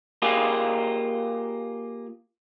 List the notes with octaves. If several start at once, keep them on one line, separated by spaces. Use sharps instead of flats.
A#3 F4 G4 G#4